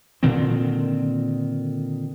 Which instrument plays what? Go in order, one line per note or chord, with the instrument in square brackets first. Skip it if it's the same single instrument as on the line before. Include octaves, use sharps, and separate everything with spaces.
[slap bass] A#2 D3 D#3 C4